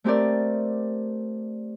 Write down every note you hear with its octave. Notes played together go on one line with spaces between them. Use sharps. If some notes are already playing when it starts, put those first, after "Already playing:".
A3 C4 G4 A#4 D5